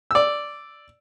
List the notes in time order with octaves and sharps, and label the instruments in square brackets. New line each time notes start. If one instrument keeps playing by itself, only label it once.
[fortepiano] D5 E6